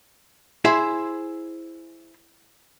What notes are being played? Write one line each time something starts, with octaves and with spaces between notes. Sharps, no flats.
E4 G#4 C5 E5